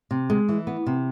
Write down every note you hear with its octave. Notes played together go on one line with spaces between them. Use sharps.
C3
G#3
E3
B3
C3